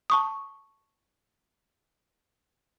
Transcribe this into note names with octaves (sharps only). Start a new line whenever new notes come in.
A5 C#6 D#6